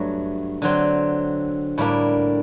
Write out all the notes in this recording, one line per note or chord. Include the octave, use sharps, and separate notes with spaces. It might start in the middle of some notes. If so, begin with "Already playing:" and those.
Already playing: G2 F#3 A3
D3 F#3 C4
A2 G3 A#3 D4